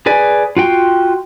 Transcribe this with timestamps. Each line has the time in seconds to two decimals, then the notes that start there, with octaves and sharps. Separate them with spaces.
0.06 G#4 B4 D5 G#5
0.57 F4 F#4 G5 C6